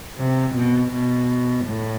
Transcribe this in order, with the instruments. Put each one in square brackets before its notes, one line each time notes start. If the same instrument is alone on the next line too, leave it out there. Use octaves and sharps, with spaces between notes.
[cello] C3
B2
B2
A2